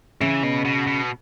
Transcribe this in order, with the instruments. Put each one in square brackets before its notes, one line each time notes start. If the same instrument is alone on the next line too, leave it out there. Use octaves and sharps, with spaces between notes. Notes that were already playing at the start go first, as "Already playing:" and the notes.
[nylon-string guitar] C#3 [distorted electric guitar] E3
[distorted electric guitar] B2
B2
B2